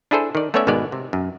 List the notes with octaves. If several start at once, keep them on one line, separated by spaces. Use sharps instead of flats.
D4 E4 G#4 A4 C5
D#3 D5
A3 B3 C#4 C#5 D5 E5
G#1 B2 D#3 G#3 B3 D5
C3
F#2